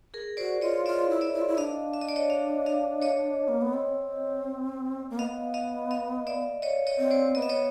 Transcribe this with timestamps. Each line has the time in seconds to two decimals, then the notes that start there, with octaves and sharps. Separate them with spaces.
0.14 G#4 A#4
0.37 F#4 C5 D5
0.61 F4 C#5 D#5
0.86 F4 D5 E5
1.10 E4
1.21 D5 E5
1.33 E4
1.41 F4
1.48 E4
1.57 D4 D#5 F5
1.93 E5
2.02 D#5
2.09 D5
2.16 C#5 D#5
2.30 D#5 F5
2.66 D#5 F5
3.02 C#5 D#5
3.48 A#3
3.62 B3
3.74 C4
5.10 A#3
5.18 B3 D#5 F5
5.54 D#5 F5
5.91 D#5 F5
6.27 D5 E5
6.62 C#5 D#5
6.87 C#5 D#5
6.98 C4
7.11 C5 D5
7.35 B3 D#5
7.42 E5
7.49 C#5 D#5